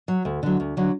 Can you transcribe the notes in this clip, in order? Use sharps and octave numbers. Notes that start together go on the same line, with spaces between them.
F#3
D2
D3 F#3
D2
D3 F#3